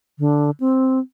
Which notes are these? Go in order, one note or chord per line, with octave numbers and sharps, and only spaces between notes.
D3
C4